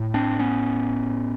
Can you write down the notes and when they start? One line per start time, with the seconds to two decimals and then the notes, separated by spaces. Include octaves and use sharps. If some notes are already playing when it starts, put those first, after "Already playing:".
Already playing: A2
0.14 C4 D4
0.39 B3 C#4